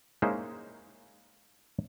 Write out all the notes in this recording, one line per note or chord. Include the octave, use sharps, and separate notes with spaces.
G#3 A#3 C#4 D#4 E4 C5